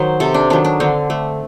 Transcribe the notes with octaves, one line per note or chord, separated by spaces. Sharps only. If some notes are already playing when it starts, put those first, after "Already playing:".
Already playing: D#3 F#3 C5
C3 A4
D4
D#3 F#3 D4
D4
D3 C4
A3